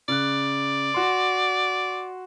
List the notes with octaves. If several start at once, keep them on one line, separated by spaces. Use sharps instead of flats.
C#3 D5 F#6
F#4 C6